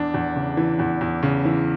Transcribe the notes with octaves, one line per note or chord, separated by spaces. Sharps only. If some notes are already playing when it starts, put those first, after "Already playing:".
Already playing: E2 D4
E2
C#3
E3
E2
E2
C#3
E3